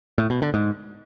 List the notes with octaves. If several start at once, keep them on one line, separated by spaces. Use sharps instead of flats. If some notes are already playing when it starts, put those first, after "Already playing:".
A2
B2
D3
G#2